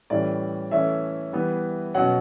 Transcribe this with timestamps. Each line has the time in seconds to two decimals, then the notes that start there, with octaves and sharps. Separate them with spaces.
0.10 A2 E3 G3 C#4 D5
0.71 E3 A3 C#4 E5
1.33 E3 G3 B3
1.94 B2 F#3 C#4 F#5